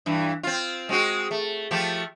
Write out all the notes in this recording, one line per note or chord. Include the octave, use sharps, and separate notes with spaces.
G2 E3
C4 F4
G#3 C4 F#4
A3
F3 A3 G4